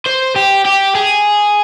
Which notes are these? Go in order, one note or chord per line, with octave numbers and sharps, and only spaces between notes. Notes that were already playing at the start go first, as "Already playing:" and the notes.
C5
G4
G4
G#4